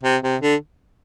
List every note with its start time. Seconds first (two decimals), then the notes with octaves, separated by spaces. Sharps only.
0.03 C3
0.23 C3
0.41 D3